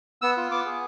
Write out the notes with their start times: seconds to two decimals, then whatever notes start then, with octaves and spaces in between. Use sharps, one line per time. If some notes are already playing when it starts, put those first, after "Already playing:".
0.22 B3 E6
0.37 F4
0.51 B3 D6
0.66 G#4